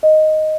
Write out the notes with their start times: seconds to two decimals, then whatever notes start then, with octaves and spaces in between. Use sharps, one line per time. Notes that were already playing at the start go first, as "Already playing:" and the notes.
0.03 D#5